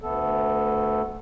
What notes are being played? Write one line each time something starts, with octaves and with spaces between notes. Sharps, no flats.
D2 A3 B3 A4